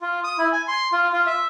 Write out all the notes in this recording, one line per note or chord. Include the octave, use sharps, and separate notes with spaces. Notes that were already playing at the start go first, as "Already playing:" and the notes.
F4
D#6
E4
G#5
C6
F4
F4
E5